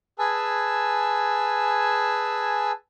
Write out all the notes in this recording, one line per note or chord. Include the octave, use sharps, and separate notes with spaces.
G#4 B4 G#5 A5 E6